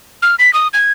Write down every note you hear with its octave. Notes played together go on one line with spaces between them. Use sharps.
F6
B6
D#6
G#6